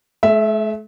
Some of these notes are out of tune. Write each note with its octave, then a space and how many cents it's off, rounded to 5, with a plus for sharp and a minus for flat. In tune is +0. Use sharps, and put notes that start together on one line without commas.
A3 -45 E5 +0